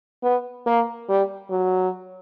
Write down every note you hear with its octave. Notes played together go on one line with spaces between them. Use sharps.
B3
A#3
G3
F#3